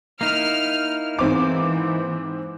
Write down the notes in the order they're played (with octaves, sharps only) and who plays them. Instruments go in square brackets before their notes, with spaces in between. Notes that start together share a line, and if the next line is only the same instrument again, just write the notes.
[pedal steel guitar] A#3 D#4 E4 [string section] F6
[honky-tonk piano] G#2 C4 D6 [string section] E3